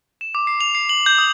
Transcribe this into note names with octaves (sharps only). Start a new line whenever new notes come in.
E7
D6
C7
F7
C7
F#7
G6
D#6